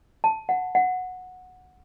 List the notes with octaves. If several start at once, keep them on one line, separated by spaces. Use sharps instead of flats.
A5
F#5
F#5